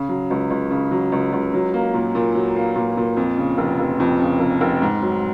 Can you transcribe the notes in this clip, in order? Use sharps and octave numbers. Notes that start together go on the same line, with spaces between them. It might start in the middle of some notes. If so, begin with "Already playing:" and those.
Already playing: C#3
F#3
C#2
C#2
C#3
F#3
C#2
C#2
F#3
A#3
A#2
A#2
F#3
A#3
A#2
A#2
F2
C#3
F1
F1
F2
C#3
F1
F1
G#2
F#3